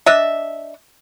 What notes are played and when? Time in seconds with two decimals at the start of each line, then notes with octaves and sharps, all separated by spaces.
0.06 D4 D#5 E5